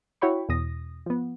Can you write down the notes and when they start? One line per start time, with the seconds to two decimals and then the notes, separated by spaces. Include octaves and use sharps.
0.21 E4 F#4 C#5 G5 B5 C#6
0.49 E2 B2 D#6 A#6
1.06 F3 B3